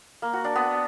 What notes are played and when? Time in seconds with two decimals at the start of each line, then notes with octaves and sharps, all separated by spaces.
0.22 A#3
0.33 F#4
0.44 D4
0.55 B3